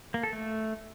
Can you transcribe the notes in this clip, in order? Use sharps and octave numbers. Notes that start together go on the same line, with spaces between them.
A#3
A4
A3